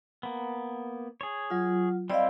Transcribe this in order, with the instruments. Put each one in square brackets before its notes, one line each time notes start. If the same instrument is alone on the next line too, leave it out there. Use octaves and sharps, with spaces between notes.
[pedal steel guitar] A#3 B3
G#4 C#5
[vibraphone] F#3 F4
[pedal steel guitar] G3 C4 E4 [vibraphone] D5 D#5 F5